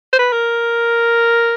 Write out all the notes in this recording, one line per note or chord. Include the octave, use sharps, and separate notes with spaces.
C5
B4
A#4